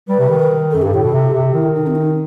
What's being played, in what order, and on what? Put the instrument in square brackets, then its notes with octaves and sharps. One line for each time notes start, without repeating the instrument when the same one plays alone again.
[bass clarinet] G3 [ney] B4
[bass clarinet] C3
D#3
[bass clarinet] F#2 [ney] A4
[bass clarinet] G2 [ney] G4
[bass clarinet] A2 [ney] A4
[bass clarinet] B2
C3
C3
[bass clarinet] D#3 [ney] E4
[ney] D#4
C4
D#4